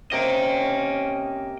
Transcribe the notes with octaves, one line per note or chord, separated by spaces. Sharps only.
C3 A#3 C#4 D#5 G5